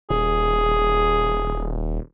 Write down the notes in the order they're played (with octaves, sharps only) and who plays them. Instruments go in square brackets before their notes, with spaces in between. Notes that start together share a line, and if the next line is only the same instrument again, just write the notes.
[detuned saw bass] D#1 [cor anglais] G#4